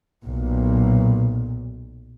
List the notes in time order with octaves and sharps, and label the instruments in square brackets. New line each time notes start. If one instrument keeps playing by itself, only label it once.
[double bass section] B1 A#2